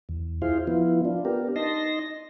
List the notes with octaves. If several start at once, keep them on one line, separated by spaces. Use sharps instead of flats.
E2
E4 F4 G#4 C5 F5
F3 B3 E4 F4
D4 F4
B3 D4 G4 A#4
D#4 D#5 A5 C6 A#6